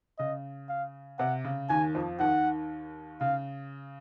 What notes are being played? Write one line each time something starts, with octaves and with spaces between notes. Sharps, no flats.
C#3 D#5
F5
C3 F#5
C#3
D#2 D#3 G#5
F2 F3
D#2 D#3 F#5
C#3 F5